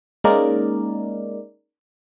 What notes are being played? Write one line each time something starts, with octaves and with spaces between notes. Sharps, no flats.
G#3 A#3 C#4 D#4 A#4 D5